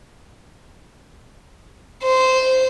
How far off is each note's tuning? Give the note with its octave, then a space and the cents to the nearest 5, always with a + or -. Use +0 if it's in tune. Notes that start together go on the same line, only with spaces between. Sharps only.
C5 -10